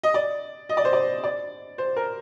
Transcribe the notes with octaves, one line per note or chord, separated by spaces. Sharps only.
D#5
D5
D#5
D5
C5
D5
D5
C5
A#4